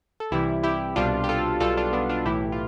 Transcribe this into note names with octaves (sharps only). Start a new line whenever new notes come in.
A4
C2 C3 E3 G3 E4 G4
E4 G4
C2 B2 G3 D4 F4
G4
F4 A4
B1 B2 G3 F4 A4
D4 F4
B3 D4
D4 F4
B1 A2 E3 E4 G4
F4